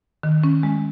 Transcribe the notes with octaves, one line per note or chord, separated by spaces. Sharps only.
D#3
C#4
G#3